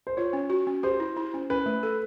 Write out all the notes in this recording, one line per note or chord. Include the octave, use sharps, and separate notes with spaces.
C5
F4 C#5
C#4
F#4
C#4
G4 C5
E4
E4
C#4
C#4 B4
A3
A4